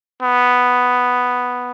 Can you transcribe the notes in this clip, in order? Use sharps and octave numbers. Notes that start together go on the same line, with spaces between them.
B3